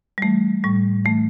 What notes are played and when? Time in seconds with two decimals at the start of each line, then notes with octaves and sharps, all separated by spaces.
0.18 G3
0.22 E3 A3
0.64 A2 G3
1.04 E3 A3